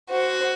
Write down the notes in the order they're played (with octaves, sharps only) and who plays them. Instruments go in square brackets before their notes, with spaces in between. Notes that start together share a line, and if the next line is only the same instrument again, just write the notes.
[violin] F#4 [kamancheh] C5